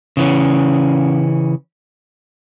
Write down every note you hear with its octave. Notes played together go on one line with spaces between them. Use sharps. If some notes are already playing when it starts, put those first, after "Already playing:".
C#3 E3 C#4